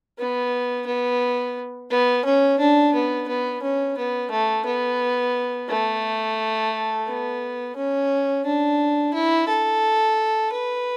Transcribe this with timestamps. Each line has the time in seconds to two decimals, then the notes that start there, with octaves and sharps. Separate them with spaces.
0.18 B3
0.86 B3
1.90 B3
2.25 C#4
2.59 D4
2.94 B3
3.28 B3
3.62 C#4
3.97 B3
4.31 A3
4.65 B3
5.69 A3
7.07 B3
7.76 C#4
8.45 D4
9.14 E4
9.48 A4
10.52 B4